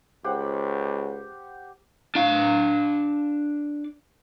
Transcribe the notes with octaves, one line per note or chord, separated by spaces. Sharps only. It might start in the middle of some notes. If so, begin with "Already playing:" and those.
C#2 G4 C5 F#5
D4 F5